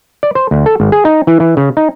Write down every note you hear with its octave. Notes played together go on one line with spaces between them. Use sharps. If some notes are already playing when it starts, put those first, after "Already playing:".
D5
C5
D2
A4
G#1
G#4
D#4
E3
E3
C#3
D#4